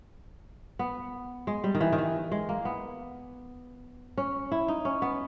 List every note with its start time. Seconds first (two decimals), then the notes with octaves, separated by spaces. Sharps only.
0.79 B3
1.47 G#3
1.64 G3
1.75 D#3
1.81 E3
1.92 D#3
1.98 E3
2.32 G#3
2.49 A#3
2.65 B3
4.18 C#4
4.52 E4
4.68 D#4
4.85 C#4
5.02 B3